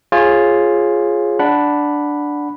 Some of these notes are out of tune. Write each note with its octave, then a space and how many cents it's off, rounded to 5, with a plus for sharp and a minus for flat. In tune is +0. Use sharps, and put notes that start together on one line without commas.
F4 +0 G#4 +0 C#5 -35
D4 +0 F#5 +0 B5 +0